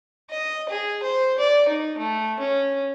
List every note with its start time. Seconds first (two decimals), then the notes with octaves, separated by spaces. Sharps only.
0.30 D#5
0.69 G#4
1.03 C5
1.39 D5
1.68 D#4
1.98 A3
2.40 C#4